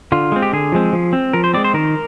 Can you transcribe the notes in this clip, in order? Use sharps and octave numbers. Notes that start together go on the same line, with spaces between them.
D3 F4
G#3 C4
G4
D3 G#4
F3 G#3 C4
F3
C4
F3 A#4
C5
G#3 C4 D5
C5
D#3 A#4